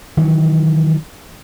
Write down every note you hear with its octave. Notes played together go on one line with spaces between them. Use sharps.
D#3 E3 F#3